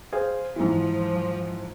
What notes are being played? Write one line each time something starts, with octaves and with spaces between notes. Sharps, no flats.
G#4 C5 F5
G#2 E3 F3